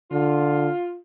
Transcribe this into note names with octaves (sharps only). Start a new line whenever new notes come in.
D3 F4